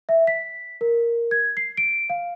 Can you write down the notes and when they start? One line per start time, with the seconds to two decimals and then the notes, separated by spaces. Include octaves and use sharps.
0.09 E5
0.27 B6
0.81 A#4
1.31 G#6
1.57 C7
1.77 D7
2.10 F5